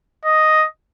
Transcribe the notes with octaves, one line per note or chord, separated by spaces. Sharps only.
D#5